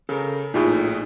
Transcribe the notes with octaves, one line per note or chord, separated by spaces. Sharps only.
C#3 A4 A#4
A#1 A2 D#4 F4 G4 G#4